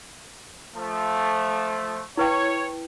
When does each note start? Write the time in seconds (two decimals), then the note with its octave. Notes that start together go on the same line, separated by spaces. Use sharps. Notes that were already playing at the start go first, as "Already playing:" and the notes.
0.75 F3 A3
2.17 E4 B4 C#5 G5